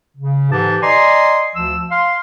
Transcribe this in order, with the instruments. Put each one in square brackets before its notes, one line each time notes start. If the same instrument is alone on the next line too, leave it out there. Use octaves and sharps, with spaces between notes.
[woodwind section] C#3
G#2 D3 E3 G4 A5
D5 D#5 G#5 A#5 C6
D2 F3 E6
F5 C6